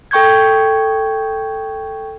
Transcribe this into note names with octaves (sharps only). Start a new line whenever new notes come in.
A4 G5 C#6 G6 G#6